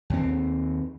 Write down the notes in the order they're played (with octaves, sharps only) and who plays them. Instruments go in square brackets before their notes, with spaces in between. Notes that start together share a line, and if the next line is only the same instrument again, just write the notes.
[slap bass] D#2 C4